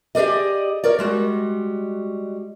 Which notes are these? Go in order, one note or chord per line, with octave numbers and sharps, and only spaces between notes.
G4 G#4 B4 D5 D#5
A#4 C#5 D5
G3 G#3 F#4